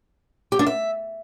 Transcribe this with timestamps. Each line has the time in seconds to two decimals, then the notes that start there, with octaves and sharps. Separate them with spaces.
0.52 G4
0.59 D4
0.67 E5